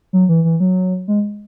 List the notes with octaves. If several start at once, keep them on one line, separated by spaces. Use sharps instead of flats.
F#3
E3
E3
F#3
G#3